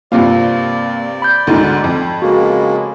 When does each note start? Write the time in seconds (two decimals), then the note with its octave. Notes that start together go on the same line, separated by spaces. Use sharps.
0.12 G2 C3 A#3 F4 D5
1.22 B5 G6
1.47 D2 G#2 D3
1.84 F2
2.22 C#3 G#3 A#3 F#4